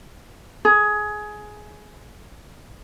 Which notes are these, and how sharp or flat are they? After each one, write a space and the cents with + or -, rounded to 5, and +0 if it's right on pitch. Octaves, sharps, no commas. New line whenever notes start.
G#4 +15